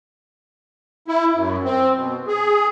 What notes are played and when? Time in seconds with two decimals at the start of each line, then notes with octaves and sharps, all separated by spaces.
1.08 E4
1.34 F#2
1.64 C4
1.96 B2
2.27 G#4